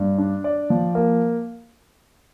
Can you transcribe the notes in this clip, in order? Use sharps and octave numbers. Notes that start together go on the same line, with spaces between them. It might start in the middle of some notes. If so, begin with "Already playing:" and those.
Already playing: G2
D4
D5
F3
A#3